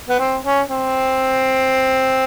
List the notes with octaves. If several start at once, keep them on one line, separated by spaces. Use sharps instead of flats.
B3
C4
C#4
C4